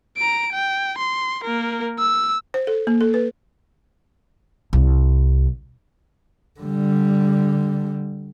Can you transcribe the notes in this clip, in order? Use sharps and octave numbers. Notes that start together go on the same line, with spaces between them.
A#5 D7
G5
C6
A#3 A#4
E6
C5
A4
A#3
A4
B4
C2
D3 G3